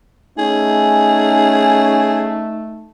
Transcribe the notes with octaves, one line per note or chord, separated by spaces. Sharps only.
A3 C#4 D#4 G#4